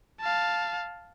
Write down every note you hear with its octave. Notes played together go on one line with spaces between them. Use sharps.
F5 A5